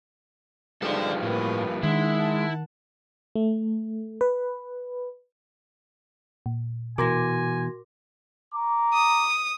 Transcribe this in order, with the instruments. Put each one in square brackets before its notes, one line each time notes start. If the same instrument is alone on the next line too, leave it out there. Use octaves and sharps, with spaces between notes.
[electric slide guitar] G2 F3 [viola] G#3 D#4 [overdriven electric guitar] A4 D5
[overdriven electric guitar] A2 [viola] A#3 B4
[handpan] D#3 [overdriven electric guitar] G#3 [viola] D4 F#5 [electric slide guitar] E4
[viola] F#5 A5
[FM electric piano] A3
B4
[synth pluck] A#2
[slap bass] B2 E3 [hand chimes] F#4 C6 A#6 [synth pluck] A#4 D6 [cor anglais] G#5
[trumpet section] A#5 D6
[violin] D#6